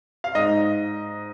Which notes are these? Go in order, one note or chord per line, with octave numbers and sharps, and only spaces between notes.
F5
G#2 D#5